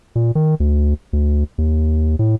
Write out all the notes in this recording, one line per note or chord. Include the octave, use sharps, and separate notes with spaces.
A#2
D#3
D2
D2
D#2
A2